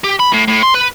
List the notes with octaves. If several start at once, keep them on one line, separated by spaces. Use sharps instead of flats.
G4
B5
A2
A2
C6
B4